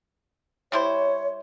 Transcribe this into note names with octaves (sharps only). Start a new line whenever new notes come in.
G3 E4 C5 C#5